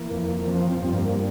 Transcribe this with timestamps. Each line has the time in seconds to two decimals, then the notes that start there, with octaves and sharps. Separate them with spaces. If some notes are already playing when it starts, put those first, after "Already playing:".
Already playing: E3 A#3
0.11 F2
0.47 F3 C4
0.71 C4
0.83 G2
0.95 A#3